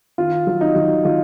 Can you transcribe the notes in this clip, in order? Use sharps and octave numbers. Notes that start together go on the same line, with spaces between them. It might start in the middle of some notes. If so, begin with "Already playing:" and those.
D#3 F4
F#3
D#4
F#3
F#3 F4